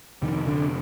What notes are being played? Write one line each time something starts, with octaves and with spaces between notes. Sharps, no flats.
F2 C3 D#3
D3